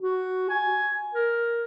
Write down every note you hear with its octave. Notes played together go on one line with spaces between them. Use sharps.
F#4
G#5
A#4